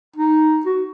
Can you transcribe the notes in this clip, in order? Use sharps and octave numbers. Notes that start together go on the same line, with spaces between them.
D#4
F#4